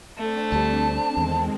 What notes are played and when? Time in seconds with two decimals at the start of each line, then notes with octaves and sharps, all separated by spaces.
0.18 A3 C4 D4
0.52 D2 G3 A5
1.17 E2 D#3 G#3 C4